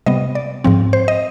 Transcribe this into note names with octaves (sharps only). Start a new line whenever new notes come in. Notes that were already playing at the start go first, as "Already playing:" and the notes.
C3 G3 B3 D#5
D5
G#2 F3 C4
C5
D#5